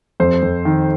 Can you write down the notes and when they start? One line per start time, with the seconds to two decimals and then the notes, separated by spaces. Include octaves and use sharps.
0.20 F2 C5
0.42 F2
0.65 D#3